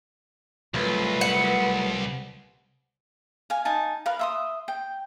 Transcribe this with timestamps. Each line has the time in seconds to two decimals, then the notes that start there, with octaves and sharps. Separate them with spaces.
0.74 C2 F#3 A3 F4 B4
1.21 F#5
3.50 F5 G#5
3.65 D#4 G#5 A5
4.06 A#4 B4 F5
4.19 E5 C6 D#6
4.68 G5